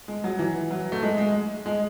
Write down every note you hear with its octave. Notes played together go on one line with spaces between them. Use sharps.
G#3
F#3
E3
F#3
A3
G#3
G#3
G#3